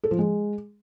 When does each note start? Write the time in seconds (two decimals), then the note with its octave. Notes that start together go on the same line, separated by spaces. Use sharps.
0.04 A4
0.11 F3
0.19 G#3